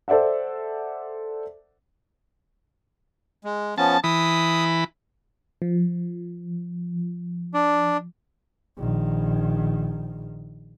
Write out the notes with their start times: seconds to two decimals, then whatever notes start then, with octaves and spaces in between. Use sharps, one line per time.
0.08 A4 C5 D5 E5 F#5
3.44 G#3
3.78 F3 B3 C#4 A5
4.04 E3 B5 D#6
5.62 F3
7.54 D4
8.78 A#1 D#3